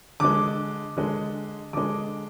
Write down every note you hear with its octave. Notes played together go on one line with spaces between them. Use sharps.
D3 G#3 D6
D3 G#3
D3 G#3 D6